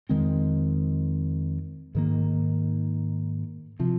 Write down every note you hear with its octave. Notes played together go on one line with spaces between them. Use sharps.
F2 D#3 G#3 C4
G#2 D#3 A#3
C3 F3